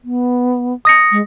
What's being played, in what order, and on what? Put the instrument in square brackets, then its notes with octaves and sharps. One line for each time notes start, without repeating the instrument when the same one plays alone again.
[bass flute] B3
[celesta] D#6 A#6 C#7
[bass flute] G#3